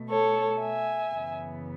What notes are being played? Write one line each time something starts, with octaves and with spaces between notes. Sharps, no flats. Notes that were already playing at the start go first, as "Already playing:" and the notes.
Already playing: B2 A3
A4 C#5
E5 G#5
F#2 C#3 E3 B3